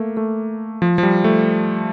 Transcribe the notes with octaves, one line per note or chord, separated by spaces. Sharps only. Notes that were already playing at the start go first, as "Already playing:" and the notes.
Already playing: A3 A#3
A3
F3
F3
G3
A3